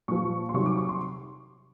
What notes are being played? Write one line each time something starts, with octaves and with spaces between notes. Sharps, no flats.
A#2 F3 C#6
C6
C3 D#3 F#3 C#6
D6
C#6
C6